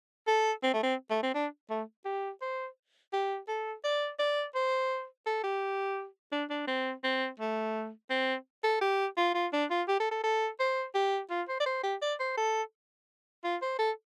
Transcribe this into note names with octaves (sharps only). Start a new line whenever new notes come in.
A4
C4
A3
C4
A3
C4
D4
A3
G4
C5
G4
A4
D5
D5
C5
A4
G4
D4
D4
C4
C4
A3
C4
A4
G4
F4
F4
D4
F4
G4
A4
A4
A4
C5
G4
F4
C5
D5
C5
G4
D5
C5
A4
F4
C5
A4